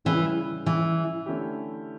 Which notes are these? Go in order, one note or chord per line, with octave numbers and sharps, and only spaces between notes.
C#3 E3 G3 C#4 G4
E3
D3 A3 C#4 E4 G4